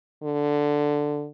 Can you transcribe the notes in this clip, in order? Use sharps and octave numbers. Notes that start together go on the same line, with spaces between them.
D3